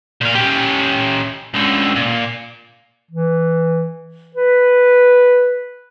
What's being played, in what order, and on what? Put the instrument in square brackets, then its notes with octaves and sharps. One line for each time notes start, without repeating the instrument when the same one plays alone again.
[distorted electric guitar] A#2 F5
C#4 G4
C#2 D3
A#2
[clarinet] E3
B4